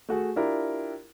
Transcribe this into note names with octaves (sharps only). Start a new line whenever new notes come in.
A3 F#4 G#4
D4 E4 F4 G4 A#4